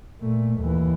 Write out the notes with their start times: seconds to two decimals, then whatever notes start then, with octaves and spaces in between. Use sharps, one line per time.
0.20 A#2 A3
0.58 D#2 E3